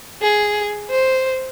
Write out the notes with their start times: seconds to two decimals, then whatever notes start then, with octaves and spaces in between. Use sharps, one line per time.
0.21 G#4
0.90 C5